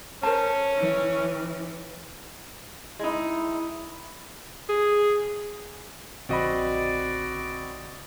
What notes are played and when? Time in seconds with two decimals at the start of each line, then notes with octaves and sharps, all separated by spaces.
0.23 C#4 A#4 C5 A5
0.77 E3
2.99 G#3 D#4 E4
4.69 G#4
6.29 A#1 D3 C4 F#4 D5 D#5 B5